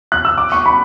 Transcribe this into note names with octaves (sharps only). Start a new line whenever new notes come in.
F#6
E6
D6
C#6
B5